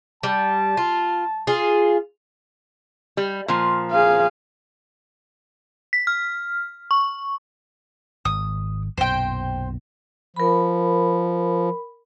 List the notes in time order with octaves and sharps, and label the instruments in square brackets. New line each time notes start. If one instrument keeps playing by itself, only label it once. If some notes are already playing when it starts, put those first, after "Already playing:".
[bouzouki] G3 [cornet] A5
[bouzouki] F4
F4 G#4
[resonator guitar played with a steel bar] G3
A#2 F3
[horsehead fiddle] G#4 F5
[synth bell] B6
F6
C#6
[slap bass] G#1 [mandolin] D#6
[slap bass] B1 F#2 A#2 [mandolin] C5 G5
[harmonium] F3 [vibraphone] A#4 B5